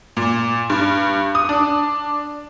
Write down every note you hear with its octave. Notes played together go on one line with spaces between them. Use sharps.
A#2
G2
D#6
D4